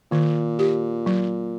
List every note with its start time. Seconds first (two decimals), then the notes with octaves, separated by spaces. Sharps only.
0.11 A#2 D#3
0.59 G4
1.06 F#3